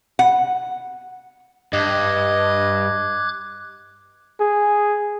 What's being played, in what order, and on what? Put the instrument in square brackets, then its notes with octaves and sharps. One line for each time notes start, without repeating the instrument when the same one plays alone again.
[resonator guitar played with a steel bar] F#5
[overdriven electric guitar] G2 [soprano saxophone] D#5 [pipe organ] D6 F#6 G#6
[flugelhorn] G#4